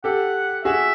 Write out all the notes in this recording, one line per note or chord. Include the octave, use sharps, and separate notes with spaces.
G4 A4 F#5
F#4 G#4 E5